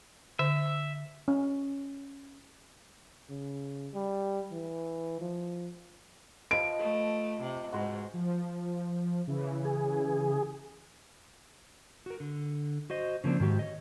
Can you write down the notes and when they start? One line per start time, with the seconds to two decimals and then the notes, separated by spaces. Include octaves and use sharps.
0.39 D3 E5
1.28 C#4
3.30 C#3
3.94 G3
4.52 E3
5.21 F3
6.51 F3 B4 D#5 D7
6.79 A3 D#6
7.41 C3
7.72 G#2 F#4 B4 C5
8.14 F3
9.27 C#3 E3
9.65 G#4
12.06 F#4 A#4
12.20 D3
12.90 F#4 C5 D#5
13.24 C#3 F3 A#3 C4 D4
13.40 G#2 D#3 F#4 G4
13.59 C#5 D#5